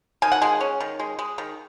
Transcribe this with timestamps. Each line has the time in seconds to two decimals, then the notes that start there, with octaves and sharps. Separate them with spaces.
0.22 D#3 G#5
0.32 F#5
0.42 G#3 G#5
0.61 C#4
0.80 D#3
1.00 G#3
1.19 G#3
1.38 D#3